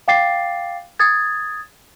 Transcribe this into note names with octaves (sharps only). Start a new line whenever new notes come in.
F5 G5 D6 A6 C7
D#6 G#6 A6